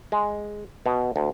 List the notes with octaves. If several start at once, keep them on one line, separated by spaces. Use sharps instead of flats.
G#3
B2
D2